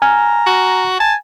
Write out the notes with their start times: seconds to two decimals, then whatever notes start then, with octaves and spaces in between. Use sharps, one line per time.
0.02 G#5 A#5 F6
0.46 F#4
1.00 G#5 A5